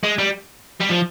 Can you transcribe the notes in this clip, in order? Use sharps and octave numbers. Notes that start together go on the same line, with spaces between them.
G#3
G3
G3
F3